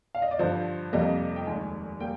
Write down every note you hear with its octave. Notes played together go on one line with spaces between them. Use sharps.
F5
D#5
D5
G2 D3 F3 C5
F2 C3 G3 A#3 D#5
G5
F1 D#2 D#3 G#3 G#5
G3 A#3 G5